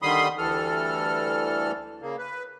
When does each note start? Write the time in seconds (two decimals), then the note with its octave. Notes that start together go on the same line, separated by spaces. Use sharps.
0.02 D3 D#3 G3 B5 C6 D#6
0.38 D2 E3 G3 A4 F6
2.02 C#3 A#3
2.18 B4